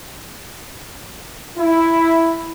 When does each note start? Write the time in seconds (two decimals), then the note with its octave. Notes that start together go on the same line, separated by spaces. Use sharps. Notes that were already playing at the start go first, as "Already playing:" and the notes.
1.59 E4